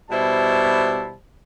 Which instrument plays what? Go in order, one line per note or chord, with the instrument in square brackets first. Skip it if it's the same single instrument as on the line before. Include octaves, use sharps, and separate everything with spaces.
[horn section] B2 G3 E4 C5 A5